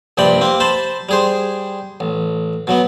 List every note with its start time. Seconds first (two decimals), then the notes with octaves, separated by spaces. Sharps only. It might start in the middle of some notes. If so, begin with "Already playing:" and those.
0.17 A#1 G2 C3 D5 G5 B5
0.41 A#3 C4 G4
0.60 C5 A5 B5 C6
1.09 G3 G#4 C5
2.00 A1
2.67 B2 F#3 B3